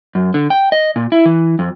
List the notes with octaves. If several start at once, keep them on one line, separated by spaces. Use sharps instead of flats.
F#2
D3
G5
D#5
A#2
E4
E3
F2